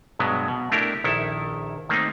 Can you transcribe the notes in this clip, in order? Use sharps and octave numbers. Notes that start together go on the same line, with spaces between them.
G2 B2 F#3 G#3 B3
B2
A3 D4 E4 G4 A#4
A#1 D#3 E4 A4 E5
D#3 A3 A#3 C4 D#4